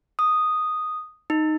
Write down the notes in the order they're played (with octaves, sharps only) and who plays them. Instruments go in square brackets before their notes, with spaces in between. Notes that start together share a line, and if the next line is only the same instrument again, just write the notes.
[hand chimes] D#6
D#4